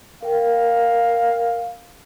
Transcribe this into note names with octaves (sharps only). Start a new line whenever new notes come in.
A#4 F5 G5